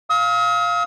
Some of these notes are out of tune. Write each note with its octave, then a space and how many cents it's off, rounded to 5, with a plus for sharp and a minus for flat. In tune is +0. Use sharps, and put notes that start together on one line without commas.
F5 +0 D#6 +45